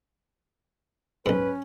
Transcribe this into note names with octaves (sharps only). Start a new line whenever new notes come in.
B1 G#2 C#4 B4